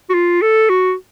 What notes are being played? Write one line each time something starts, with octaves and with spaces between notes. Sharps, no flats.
F#4
F4
A4
F#4